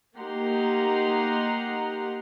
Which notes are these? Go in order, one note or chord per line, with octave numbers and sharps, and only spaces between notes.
A#3 D#4 G4 F#5 A#5 C6